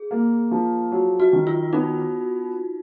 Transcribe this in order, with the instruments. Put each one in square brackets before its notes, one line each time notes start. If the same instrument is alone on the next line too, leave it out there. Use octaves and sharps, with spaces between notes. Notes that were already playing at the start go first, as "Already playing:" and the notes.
Already playing: [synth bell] G#4
[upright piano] A#3
F3
F#3
[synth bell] F#4
[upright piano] D#3
[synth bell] F4
[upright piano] B3 [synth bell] D#4